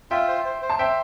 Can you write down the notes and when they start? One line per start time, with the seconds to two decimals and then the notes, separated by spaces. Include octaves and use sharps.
0.11 F4 E5 G5
0.28 C5
0.45 C5
0.62 C5
0.70 A5
0.79 C5 E5 G5